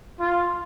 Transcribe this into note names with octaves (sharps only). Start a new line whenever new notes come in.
F4